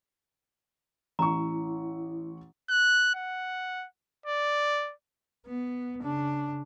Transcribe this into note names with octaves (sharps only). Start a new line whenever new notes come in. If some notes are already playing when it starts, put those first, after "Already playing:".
A1 E4 A#5 C#6
F#6
F#5
D5
B3
C#3 D4